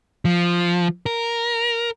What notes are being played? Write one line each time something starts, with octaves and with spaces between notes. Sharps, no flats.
F3
A#4